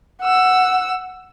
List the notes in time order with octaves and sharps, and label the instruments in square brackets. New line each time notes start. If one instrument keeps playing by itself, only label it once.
[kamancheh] F#5 E6